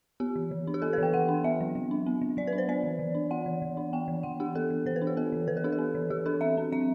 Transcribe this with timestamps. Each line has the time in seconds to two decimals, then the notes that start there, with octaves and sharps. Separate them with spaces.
0.20 B3 G4
0.36 E3
0.51 E3
0.67 D4
0.74 G4
0.82 B3 A4
0.93 B4
0.98 E3 G5
1.14 E3 F#5
1.29 D4
1.44 B3 E5
1.61 F#3
1.75 F#3
1.91 D4
2.06 B3
2.22 F#3
2.37 F#3 D5
2.47 B4
2.53 D4
2.58 C5
2.68 B3 D5
2.84 E3
2.99 E3
3.15 D4
3.30 B3 F#5
3.46 E3
3.62 E3
3.77 D4
3.93 B3 G5
4.08 E3
4.23 E3 F#5
4.40 D4 G4
4.55 B3 A4
4.70 E3
4.86 E3 C5
4.96 B4
5.02 D4
5.07 G4
5.17 B3 A4
5.32 E3
5.48 E3 B4
5.57 A4
5.64 D4 G4
5.72 A4
5.79 B3
5.95 E3
6.10 E3 G4
6.26 D4 A4
6.41 C4 E5
6.57 C4
6.72 F#3 E5